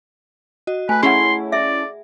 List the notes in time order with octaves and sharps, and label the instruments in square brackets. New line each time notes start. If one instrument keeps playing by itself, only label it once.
[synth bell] F#4 D#5
[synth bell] A3 [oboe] B4 [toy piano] G#5
[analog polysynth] A3 C#4 E4 [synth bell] G#4 [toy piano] F#5 B5 [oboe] C6
[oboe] D5 [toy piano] E5